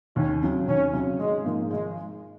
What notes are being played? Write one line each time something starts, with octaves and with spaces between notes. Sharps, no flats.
D#2 C#4
C#3 F#3
D#2 C#4
C#3 F#3
G#1 G#3
G#2 F3 A#3
G#1 G#3